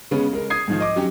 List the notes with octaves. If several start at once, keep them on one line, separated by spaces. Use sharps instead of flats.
C#3 G#3 B3 C#4
G#3 A#4
D#6 G#6 C7
G#2 D#3 F3
D#5 D6
F#3 C#4 G4